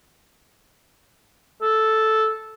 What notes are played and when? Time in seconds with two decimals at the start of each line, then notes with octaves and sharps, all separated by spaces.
1.62 A4